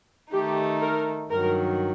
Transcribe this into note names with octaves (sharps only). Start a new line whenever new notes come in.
D#3 A3 D#4 G4
A#4
G2 D#3 F#3 A#4